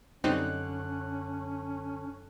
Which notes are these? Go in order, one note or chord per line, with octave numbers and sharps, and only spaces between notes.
F#2 D3 G3 C4 C#4 D#4 C#5 F#6